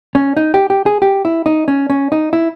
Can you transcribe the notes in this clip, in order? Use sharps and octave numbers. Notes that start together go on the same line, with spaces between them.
C#4
D#4
G4
G4
G#4
G4
E4
D#4
C#4
C#4
D#4
E4